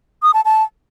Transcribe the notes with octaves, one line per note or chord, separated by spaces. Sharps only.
D#6
A5
A5